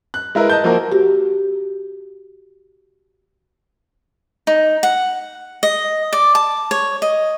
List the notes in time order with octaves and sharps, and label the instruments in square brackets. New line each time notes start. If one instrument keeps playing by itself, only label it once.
[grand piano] F#6
G#3 E4 A#4 B4
D#5 A5 G6
F3 A#3 F#4 A#4
[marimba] F#4 G4
[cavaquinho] D#4
F#5
D#5
D5
A5
C#5
D#5